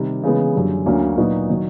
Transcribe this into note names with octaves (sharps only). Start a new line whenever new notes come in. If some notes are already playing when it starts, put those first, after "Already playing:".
Already playing: C3 D#3 G3
C#3 E3 G#3 B3
F#2 D3 G3
D2 D3 F#3 A#3 C#4
A#2 F#3 B3 D#4 F#4
D#3 F#3